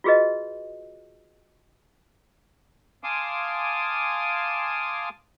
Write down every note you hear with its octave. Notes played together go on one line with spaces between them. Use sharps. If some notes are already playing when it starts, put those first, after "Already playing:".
F4 F#4 G#4 B4 D#5
F5 G#5 A5 C6 D6 D#6